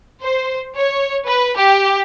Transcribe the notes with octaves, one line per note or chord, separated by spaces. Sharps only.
C5
C#5
B4
G4